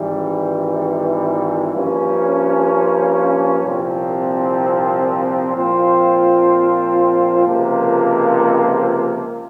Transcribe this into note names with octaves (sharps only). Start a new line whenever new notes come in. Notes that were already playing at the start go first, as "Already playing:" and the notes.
Already playing: G#1 G#2 E3 G3
G2 F3 A#3 C#4
C2 A#2 F3 C4
A#2 F3 C4 F4 C5
C#2 C3 F3 A#3